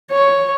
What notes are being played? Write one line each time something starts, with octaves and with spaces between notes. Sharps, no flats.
C#5